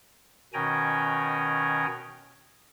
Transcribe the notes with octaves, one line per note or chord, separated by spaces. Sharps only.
B2 D#3 C#4 G5 G#5 A#5